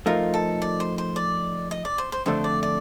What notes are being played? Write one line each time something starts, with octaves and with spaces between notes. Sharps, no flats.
F3 A3 D#4 F4 A#4
A4
D5
C5
C5
D5
D#5
D5
C5
C5
F2 D3 A3 D4 C5
D5
D5